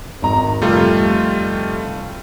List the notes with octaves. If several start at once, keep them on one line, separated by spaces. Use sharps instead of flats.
G#1 A#5
F1 G3 A3 F4